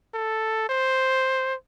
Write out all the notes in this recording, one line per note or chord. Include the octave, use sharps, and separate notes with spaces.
A4
C5